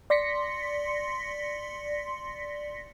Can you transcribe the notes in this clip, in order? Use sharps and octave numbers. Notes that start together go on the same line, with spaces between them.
D5 C6 A#6 B6 C#7